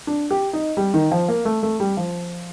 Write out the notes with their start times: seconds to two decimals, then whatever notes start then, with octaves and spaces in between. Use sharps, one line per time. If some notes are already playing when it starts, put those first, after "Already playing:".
0.07 D4
0.31 G4
0.53 D#4
0.77 G3
0.94 D#3
1.12 F3
1.28 A#3
1.45 A3
1.63 A3
1.80 G3
1.97 F3